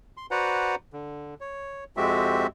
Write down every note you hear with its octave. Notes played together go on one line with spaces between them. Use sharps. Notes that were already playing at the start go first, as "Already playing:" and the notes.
C6
F#4 B4 C5 D5 F#5 A#5
D3
C#5
F2 G#3 C4 F#4 G4 E5